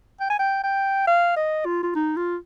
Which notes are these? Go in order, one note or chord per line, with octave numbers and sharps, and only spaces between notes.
G5
G#5
G5
G5
F5
D#5
F4
F4
D#4
F4